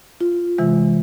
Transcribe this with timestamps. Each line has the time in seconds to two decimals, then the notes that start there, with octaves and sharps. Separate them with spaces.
0.21 F4
0.58 C3 E3 G#3